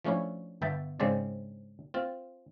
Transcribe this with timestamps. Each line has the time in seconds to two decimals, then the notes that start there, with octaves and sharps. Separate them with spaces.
0.05 F3 A3 C#4 D4 E4
0.62 G1 B3 E5 G5 A5
1.00 G#2 C#3 G#3 C4 D4 D5
1.94 C4 F4